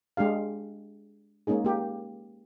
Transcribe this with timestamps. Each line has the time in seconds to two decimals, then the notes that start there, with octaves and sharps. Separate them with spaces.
0.17 G#3 D4 G4 F5
1.47 G#3 A#3 C#4 D#4 G#4
1.65 A#3 G4